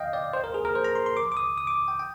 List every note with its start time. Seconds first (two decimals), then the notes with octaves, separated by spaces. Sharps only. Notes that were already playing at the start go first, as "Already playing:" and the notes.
Already playing: D#5 F5 G5
0.13 D5
0.33 C5
0.44 A#4
0.54 G#4
0.65 A#4
0.75 C5
0.84 A#5
0.95 C6
1.06 C6
1.17 D6
1.32 D6
1.37 D#6
1.58 D#6
1.67 D6
1.88 G5
1.99 G5